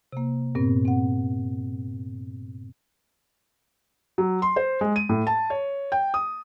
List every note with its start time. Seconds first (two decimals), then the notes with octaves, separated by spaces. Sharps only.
0.12 C3 A#3
0.55 G2 A#2 B3 C4
0.85 C4 F#5
4.18 F#3
4.42 C6
4.56 C5
4.81 G#3
4.96 D#7
5.09 A2
5.27 A5
5.50 C#5
5.92 G5
6.14 D#6